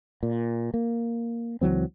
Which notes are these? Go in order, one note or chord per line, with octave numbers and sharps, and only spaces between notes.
A#2
A#3
C#2 E3 F#3 C4